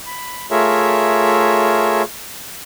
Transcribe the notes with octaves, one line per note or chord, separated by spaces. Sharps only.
B5
A3 F4 G#4 A#4 C#5 E5